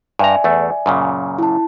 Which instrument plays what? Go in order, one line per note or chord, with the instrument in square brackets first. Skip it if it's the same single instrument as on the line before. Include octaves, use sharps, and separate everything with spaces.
[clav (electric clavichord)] G2 A#5 [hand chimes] D5 E5 G#5
[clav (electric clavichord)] E2 A3
F#2 A#2 C#3
[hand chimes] E4 A5